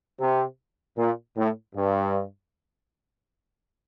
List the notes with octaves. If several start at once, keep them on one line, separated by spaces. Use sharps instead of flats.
C3
A#2
A2
G2